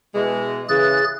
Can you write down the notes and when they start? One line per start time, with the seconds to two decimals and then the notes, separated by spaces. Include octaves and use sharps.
0.14 B2 E3 G#3
0.69 C#3 E3 G#4 F#6 A6